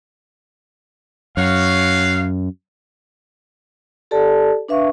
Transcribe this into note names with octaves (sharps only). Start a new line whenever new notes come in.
F#2 F#4 C#5 F5
G4 A4 D5 A5
D4 B4 E5 F5 C#6